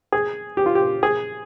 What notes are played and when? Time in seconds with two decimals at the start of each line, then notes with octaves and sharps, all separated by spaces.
0.12 G#4
0.57 G4
0.66 F4
0.75 G4
1.03 G#4